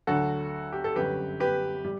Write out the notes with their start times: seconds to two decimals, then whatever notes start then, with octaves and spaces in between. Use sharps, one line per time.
0.07 D2 D3 F#3 F#4 A4
0.72 G4
0.84 A4
0.96 G1 F#2 F#3 G4 B4
1.40 G4 B4
1.85 G3